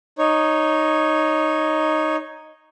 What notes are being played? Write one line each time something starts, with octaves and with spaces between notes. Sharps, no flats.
D#4 C#5